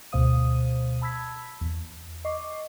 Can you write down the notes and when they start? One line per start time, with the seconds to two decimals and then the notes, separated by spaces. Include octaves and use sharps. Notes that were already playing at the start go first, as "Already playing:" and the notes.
0.12 D2 B2 C5 F5 D#6 D#7
1.01 A5 B5 E6 G#6 B6
1.61 E2
2.25 D#5 C#6 D6 C7